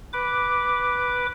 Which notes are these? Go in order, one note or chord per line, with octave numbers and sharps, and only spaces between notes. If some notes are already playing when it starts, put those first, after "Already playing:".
B4 D6